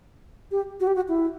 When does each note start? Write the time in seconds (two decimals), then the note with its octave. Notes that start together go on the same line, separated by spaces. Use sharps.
0.51 G4
0.80 F#4
0.87 G4
0.96 F#4
1.08 E4